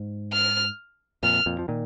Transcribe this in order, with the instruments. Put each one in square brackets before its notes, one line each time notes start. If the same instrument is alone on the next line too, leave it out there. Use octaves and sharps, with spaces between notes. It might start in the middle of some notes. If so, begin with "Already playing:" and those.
Already playing: [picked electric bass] G#2
[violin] F6
[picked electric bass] F2 A#2 [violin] F6
[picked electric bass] F2 A#2
F3
A#2 D#3